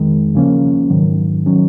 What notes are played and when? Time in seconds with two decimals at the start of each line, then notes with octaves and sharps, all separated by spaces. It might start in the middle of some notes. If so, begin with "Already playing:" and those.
Already playing: F2 D#3 G#3
0.35 D#2 C#3 F3 A#3 C#4
0.90 G#2 D#3 F#3
1.46 D#3 F#3 C#4